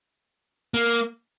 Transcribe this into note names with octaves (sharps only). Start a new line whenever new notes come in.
A#3